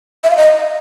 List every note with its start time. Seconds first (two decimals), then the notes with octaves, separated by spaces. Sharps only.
0.24 E5
0.30 F5
0.37 D#5